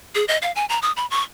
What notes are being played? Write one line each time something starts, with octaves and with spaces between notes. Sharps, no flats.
G#4
D#5
F5
G#5
A#5
D#6
B5
C#6